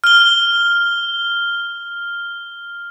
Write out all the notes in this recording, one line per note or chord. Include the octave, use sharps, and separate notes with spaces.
F6 G7